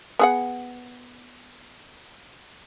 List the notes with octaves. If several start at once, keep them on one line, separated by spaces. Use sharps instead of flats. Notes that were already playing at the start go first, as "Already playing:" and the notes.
B3 G#4 F#5